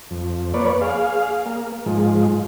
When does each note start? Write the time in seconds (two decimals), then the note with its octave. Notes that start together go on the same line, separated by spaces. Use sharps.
0.11 F2
0.54 A#3 B4 C#5 D5
0.81 G#4 F5
1.46 A#3
1.86 G#2 F3 G#3